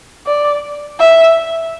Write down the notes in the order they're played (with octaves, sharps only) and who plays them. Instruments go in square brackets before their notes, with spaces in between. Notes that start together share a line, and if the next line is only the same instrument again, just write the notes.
[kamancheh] D5
E5